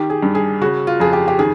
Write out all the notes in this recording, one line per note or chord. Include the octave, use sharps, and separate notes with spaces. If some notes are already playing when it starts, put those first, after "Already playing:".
Already playing: D#3 G4
G#4
G2
G#4
C#3 F#4
F4
F2 G#4
G4
G4
D#3 G#4